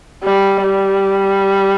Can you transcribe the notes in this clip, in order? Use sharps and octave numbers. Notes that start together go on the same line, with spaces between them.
G3
G3